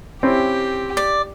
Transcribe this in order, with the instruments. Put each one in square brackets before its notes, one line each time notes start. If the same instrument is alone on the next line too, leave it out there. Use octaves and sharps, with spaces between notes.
[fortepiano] C4 C#4 E4 [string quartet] G4
[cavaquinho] D5